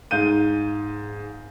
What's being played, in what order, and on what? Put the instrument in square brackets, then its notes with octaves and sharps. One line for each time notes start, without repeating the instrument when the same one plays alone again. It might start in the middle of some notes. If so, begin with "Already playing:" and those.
[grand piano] G#2 F5 G6 D#7